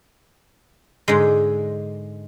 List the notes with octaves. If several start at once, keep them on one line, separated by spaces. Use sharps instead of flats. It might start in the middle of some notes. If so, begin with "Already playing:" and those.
G#2 D3 G#3